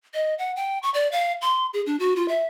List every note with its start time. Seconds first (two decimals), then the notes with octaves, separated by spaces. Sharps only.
0.14 D#5
0.39 F#5
0.56 G5
0.83 C#6
0.94 D5
1.12 F5
1.42 C6
1.73 G#4
1.86 D4
1.99 F#4
2.16 F4
2.28 E5